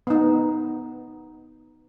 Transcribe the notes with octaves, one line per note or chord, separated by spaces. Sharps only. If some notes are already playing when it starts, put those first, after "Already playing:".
B3 D#4